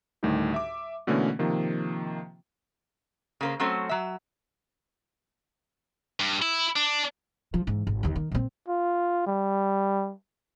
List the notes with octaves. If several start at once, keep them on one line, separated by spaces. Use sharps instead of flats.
D2 A2 D#3 G3 D#4 G4
E5 D6
B2 D3 E3 A3 A#3 C#4
C3 D#3 F3 A#3
C#3 A#3 C5
F#3 A3 C4 C#4 C5
F#3 E5
G2
E4
D4
F3
G#2 E3
G#1
D#2 D3
D#3
A#2 C4
F4
G3